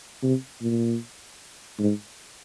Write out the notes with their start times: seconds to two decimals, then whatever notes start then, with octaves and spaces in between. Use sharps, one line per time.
0.23 C3
0.61 A#2
1.79 G#2